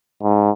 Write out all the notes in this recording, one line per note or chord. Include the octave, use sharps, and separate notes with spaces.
G#2